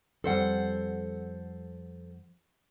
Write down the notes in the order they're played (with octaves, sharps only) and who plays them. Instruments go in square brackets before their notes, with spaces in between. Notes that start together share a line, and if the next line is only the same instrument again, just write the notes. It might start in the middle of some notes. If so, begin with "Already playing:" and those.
[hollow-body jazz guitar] F2 G3 [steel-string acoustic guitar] A4 C5 F#5